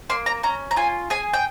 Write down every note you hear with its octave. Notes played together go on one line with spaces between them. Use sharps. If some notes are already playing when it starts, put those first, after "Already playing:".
A#3 C6
A#5
C#4 A#5
A#5
F4 G#5
G#4 G#5
G5